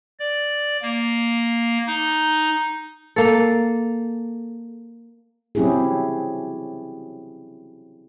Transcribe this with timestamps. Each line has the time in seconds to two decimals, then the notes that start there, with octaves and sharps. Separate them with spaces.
0.20 D5
0.82 A#3
1.87 D#4
3.16 A#3 A4
5.55 F#3 C4 C#4 E4 G4 G#4